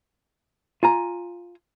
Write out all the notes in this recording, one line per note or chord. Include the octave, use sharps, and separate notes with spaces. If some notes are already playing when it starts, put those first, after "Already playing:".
F4 G#5 A#5